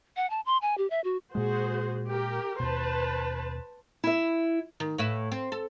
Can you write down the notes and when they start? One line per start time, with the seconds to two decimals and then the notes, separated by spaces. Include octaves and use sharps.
0.17 F#5
0.30 A5
0.46 C6
0.62 G#5
0.78 G4
0.90 E5
1.04 F#4
1.35 A#2 G#3 F#4 G#4 C5
2.08 G4 A#4
2.60 D#2 B2 B4 C5 A5
4.04 E4 E5
4.80 D#3
4.98 A2 B4 E5
5.32 C4
5.52 A4